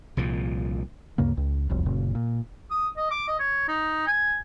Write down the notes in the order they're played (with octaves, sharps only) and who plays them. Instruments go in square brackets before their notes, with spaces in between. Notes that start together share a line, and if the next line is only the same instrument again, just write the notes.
[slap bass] C2 A#2 F3
[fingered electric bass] D2 G2 C#3 A#3
C#2
E1 C2 F2
F#1 A#2 C#3
A#2
[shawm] D#6
D#5
D6
D#5
C#5
D#4
G#5